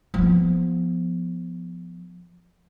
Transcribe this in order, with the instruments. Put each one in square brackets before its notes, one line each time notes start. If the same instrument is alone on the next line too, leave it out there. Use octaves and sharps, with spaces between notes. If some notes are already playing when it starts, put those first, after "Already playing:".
[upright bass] F3 B3